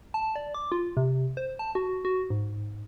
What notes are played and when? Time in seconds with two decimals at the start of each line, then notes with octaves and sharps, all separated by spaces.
0.14 A5
0.36 D5
0.54 D6
0.72 F4
0.97 C3
1.37 C5
1.59 A5
1.75 F#4
2.05 F#4
2.30 G#2